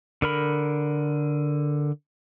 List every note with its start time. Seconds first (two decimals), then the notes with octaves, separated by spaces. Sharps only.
0.22 D3 A#4 B5